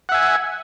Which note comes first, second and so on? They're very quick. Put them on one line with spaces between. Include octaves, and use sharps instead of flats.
F#5 E5 G#5